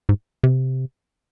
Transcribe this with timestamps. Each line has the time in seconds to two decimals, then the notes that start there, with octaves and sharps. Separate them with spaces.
0.09 G#2
0.44 C3